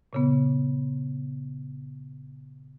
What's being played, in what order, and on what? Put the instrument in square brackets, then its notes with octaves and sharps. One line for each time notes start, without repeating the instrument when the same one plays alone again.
[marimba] A#2 C#3 B3